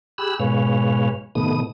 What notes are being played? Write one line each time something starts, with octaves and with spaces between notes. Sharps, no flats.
G4 G#4 B5 E6 F#6
G#2 B2 G#3 B4 C#5 F5
A2 C3 D#3 A3 B3 D#6